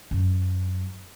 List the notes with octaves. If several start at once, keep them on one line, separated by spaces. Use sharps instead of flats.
F#2 F#3